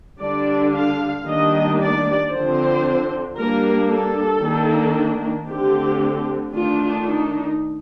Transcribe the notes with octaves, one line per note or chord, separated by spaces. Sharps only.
D3 G3 D4 D5
F5
D#3 G3 A#3 D4 D#5
D5
D3 F3 C4 C5
G3 A#3 D4 A#4
A4
D#3 A#3 D4
D3 A3 C4 G4
D#3 A3 D4 F4
D#4